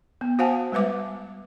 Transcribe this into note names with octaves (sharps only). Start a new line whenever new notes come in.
B3
F#4 C5 F5 F#5 G#5 A5
G3 G#3 B4 E5 D6